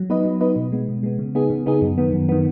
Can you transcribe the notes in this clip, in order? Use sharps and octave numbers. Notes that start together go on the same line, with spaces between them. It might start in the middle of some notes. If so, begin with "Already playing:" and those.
Already playing: F#3
B3 D#4 B4 D#5
F#3
B3 D#4 B4 D#5
B2
G#3 B3
B2
G#3 B3
C#3
B3 D#4 G#4
C#3
B3 D#4 G#4
F#2
D#3 B3
F#2
D#3 B3